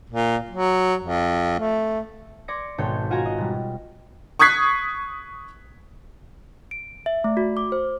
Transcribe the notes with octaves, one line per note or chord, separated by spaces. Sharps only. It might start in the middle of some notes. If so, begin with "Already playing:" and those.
A#2
F#3
F2
A3
D5 C6 D6 G#6 A#6 C#7
G#1 B2 A4 C#5 C6 G6
F4 F#4 F5 G#5 A#5
D#5
B2 G3
C#6 D#6 F#6 G#6 B6 C7
D7
E5
A3
F#4
D6
C5